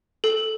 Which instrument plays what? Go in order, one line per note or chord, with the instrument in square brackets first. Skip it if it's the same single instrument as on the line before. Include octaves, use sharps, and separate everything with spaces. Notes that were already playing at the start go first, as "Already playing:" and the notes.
[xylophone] A4